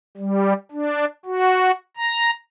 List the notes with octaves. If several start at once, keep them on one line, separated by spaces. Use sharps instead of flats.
G3
D4
F#4
A#5